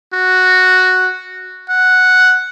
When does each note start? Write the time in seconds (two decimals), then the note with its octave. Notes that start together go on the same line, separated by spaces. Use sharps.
0.13 F#4
1.69 F#5